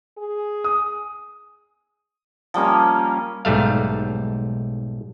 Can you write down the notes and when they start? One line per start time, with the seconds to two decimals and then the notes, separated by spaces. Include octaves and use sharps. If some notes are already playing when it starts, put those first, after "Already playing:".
0.18 G#4
0.64 D#6
2.54 F3 G3 A#3 C#4
3.45 B1 G#2 G3 A3 F5